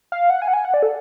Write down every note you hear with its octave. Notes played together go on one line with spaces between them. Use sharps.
F5
F#5
G#5
F#5
G#5
F#5
D5
A4